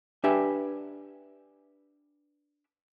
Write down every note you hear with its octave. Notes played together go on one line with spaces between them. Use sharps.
D4 G4 B4 E5 G#5